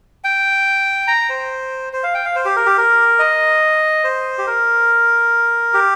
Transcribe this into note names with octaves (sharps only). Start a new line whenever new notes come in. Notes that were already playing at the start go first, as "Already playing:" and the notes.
G5
A#5
C5
C5
F5
G5
F5
C5
G4
A#4
G4
A#4
D#5
C5
G4
A#4
G4